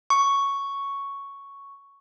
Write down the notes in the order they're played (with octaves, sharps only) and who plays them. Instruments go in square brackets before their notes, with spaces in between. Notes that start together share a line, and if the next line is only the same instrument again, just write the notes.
[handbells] C#6